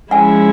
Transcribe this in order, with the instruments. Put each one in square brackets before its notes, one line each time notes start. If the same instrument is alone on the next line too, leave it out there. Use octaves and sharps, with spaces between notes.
[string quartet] F3 G#3 C#4 E4 [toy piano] F#5 G#5